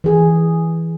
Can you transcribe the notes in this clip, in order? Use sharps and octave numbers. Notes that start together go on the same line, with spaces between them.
E3 G#4